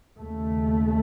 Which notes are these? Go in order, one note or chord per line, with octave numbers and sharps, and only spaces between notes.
D#2 C#3 A3